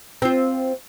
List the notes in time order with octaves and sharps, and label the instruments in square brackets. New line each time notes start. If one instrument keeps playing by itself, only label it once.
[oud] C4 F4